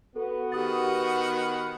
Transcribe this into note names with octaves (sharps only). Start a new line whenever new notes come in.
B3 F#4 A4
D#3 G4 B4 F#5 D#6 A6